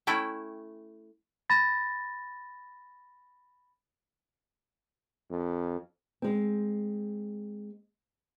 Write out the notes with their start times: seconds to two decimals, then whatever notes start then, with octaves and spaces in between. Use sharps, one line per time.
0.07 A3 C#4 E4 G5
1.50 B5 A6 A#6
5.30 F2
6.22 G#3 C4